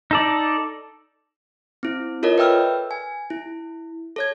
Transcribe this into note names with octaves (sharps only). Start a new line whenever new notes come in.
D#4 A4 D5
C4 E4
F4 A4 A#4 C#5 D#5
B4 D5 E5 G5 E6 F6
G#5
E4
A4 C#5 G#6